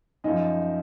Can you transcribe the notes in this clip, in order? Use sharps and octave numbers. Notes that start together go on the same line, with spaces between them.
F#2 F3 D#4